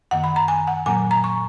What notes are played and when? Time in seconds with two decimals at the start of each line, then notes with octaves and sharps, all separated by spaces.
0.11 F#2 D#3 A#3 F#5
0.24 B5
0.36 A#5
0.48 G#5
0.68 F#5
0.86 A#2 F#3 A#3 G#5
1.11 A#5
1.24 C#6